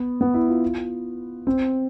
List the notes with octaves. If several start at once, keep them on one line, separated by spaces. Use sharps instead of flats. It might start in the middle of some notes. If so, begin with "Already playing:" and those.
Already playing: B3
B3
E4
F4
C4